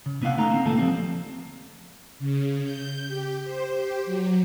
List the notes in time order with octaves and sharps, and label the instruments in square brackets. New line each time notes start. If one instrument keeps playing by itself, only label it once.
[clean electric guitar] C#3
C3 B3 E4 F5 F#5
C#3 A3 D#4 F5 A#5
A#3 C4
C#2 A#2 E3 A3 A5
F3 G3 C4
[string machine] C#3
G6
G4
C5
G4
F#3